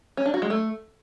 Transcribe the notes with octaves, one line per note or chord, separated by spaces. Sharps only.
C#4
D4
F#4
G#3
A3